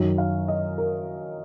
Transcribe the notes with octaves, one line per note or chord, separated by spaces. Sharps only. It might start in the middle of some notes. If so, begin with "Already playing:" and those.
Already playing: F#2 D#3 F#3
F5
D#5
A#4